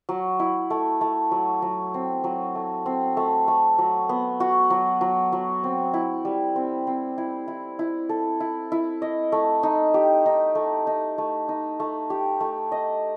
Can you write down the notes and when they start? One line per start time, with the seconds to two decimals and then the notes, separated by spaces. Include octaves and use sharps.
0.09 F#3
0.39 E4
0.70 A3
1.01 A3
1.31 F#3
1.62 F#3
1.94 C4
2.24 F#3
2.55 A3
2.86 C4
3.17 A3
3.48 A3
3.78 F#3
4.09 B3
4.40 F#4
4.70 F#3
5.01 F#3
5.32 F#3
5.64 C4
5.94 E4
6.25 G3
6.56 C4
6.87 C4
7.18 E4
7.48 E4
7.79 E4
8.09 A4
8.40 E4
8.72 E4
9.02 D#5
9.32 A3
9.63 D#4
9.94 G4
10.26 D#4
10.55 A3
10.87 D#4
11.18 A3
11.49 D#4
11.80 A3
12.10 G4
12.40 A3
12.72 D#5